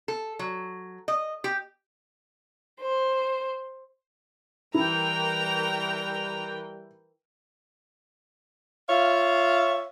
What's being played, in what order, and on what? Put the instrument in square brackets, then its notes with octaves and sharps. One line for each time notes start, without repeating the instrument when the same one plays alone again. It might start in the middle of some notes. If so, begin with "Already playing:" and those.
[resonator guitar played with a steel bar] A4
F#3
D#5
G4
[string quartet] C5
[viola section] E3 A#4 G5 [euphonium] G3 [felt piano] E4 [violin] A#5
[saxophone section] F4 C#5 E5 F5